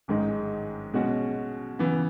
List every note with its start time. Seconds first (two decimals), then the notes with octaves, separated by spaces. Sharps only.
0.08 A1 G#2 D#3 G#3 D#4
0.93 B2 G#3 C#4 F#4
1.79 C#3 E3 B3